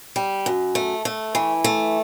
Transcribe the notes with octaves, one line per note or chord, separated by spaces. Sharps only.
G3
F#2
A3
A3
E3
A3